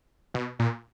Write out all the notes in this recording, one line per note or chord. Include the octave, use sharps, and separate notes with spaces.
B2
A#2